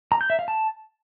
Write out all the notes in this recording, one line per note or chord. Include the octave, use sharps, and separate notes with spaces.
A#5
G6
E5
F5
A5